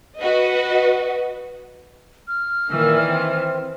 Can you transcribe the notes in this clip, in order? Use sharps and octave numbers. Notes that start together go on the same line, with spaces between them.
F#4 B4 D#5
F6
A#2 D#3 E3 E5
C4